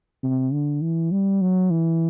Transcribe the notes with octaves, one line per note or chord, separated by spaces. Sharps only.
C3
D3
E3
G3
F#3
E3